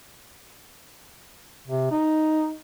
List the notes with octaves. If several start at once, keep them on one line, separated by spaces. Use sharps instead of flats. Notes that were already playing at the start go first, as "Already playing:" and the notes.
C3
D#4